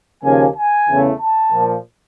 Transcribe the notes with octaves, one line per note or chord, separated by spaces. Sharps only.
D#2 C#3 F3 A#3 G#5
G#5
E2 C#3 E3 A3
A5
A#2 F3 A#3